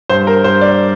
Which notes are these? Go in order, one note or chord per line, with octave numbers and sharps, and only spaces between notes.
G2 C5
A#4
G2 C5
D5